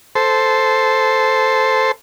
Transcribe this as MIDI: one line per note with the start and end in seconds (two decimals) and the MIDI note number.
0.15 1.92 69
0.15 1.92 72